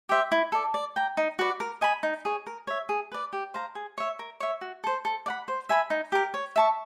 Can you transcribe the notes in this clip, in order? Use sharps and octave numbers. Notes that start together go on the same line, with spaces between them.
G4 C5 E5
E4
A4 D5
D5
G5 A#5
D#4
F#4 B4 D5
A#4
D#5 G#5 B5
D#4
G#4 C#5
A#4
C#5 E5
G#4
B4 D5
G4
C5 F5 A#5
G#4
C#5 E5
A#4
C#5 E5
F#4
A4 C5
A4
D5 F#5 B5
C5
E5 G#5 B5
D#4
G4 A#4
C#5
E5 A5 C#6